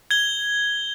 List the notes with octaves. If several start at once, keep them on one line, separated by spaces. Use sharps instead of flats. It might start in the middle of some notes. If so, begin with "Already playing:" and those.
G#6 G7